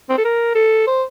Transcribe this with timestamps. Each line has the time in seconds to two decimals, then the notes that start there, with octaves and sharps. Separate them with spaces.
0.09 C4
0.18 A4
0.24 A#4
0.55 A4
0.87 C5